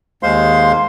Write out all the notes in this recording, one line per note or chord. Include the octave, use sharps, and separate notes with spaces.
D#2 G#3 C5 F5 C6